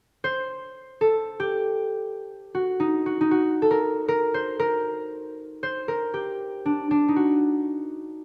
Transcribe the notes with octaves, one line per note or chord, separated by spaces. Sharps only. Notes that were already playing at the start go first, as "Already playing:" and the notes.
C5
A4
G4
F#4
D#4
F#4
D#4
F#4
A4
A#4
A#4
C5
A#4
C5
A#4
G4
D4
D4
D#4
F#4